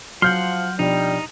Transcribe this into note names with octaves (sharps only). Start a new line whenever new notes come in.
F3 F#3 F#5 C6 F6 G6
B2 F3 G3 D4 D#4